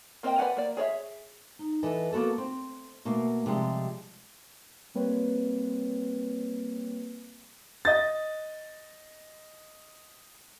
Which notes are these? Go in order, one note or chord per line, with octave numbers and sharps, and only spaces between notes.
A#3 C4 A#4 D#5 G5
B4 D5 F5 F#5 G#5
A#3 D5
G#4 C#5 D5 E5
D#4
E3 A4 B4 D#5 G#5
A#3 B3 F#4 A4 A#4
C4
B2 A3 A#3 F5
C3 F3 G3 G#3
G3 A#3 C4 B4 C#5
D#5 A6